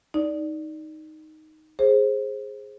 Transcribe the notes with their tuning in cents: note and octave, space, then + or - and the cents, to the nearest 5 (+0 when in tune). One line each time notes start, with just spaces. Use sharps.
D#4 +0 D5 +0
G#4 +0 C5 +20